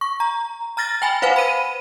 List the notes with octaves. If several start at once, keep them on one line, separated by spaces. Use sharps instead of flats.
C#6
A#5
A#5 F6 A6 A#6
G5 G#5 B5
B4 C5 F5 F#5 G#5
B5 D#7